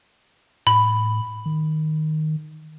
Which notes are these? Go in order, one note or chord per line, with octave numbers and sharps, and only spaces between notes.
A2 B5
D#3